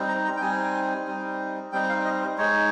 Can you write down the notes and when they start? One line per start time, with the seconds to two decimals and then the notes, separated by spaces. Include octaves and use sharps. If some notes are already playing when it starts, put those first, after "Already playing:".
Already playing: G3 C4 D#4
0.09 A#5
0.25 A#5
0.36 G5
0.41 G3 C4 D#4 G#5
1.07 G3 C4 D#4
1.72 G3 C4 D#4 G5
1.89 F5
2.05 D#5
2.21 C5
2.38 G#3 D#4 C#5